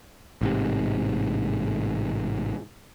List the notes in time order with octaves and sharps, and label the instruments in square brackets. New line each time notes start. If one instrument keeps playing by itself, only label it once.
[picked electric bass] A1 G#2 C3